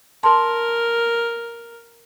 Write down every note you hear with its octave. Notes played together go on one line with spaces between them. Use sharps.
A#4 A5 C6